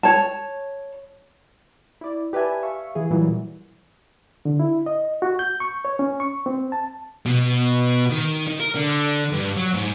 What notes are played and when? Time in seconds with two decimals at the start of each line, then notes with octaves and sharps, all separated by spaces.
0.03 C#5 A5
2.01 E4 D5
2.33 G4 B4 D5 E5 G#5 A5
2.63 E5 F5 C#6
2.95 E3 E4 G#4
3.10 A#2 E3 F#3 G3
4.45 D3
4.60 E4
4.86 D#5
5.22 F#4
5.39 G6
5.60 C#6
5.85 C#5
5.99 C#4
6.20 C#6
6.46 C4
6.72 A5
7.26 B2
8.10 D#3
8.47 D#3
8.60 A#4
8.75 D3
9.33 G2
9.56 F#3
9.74 G#2